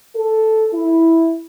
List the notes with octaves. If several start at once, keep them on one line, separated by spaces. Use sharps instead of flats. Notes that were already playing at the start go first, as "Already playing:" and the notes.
A4
E4